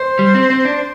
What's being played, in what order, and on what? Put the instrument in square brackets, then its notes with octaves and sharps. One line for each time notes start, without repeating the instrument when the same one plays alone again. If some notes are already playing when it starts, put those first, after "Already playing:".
Already playing: [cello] C5
[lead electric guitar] G3
C4
C4
D4